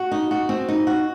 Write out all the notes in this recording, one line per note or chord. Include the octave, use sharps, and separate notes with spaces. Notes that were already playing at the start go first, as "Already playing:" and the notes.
Already playing: F#4
D#4
F#4
C4
D#4
F#4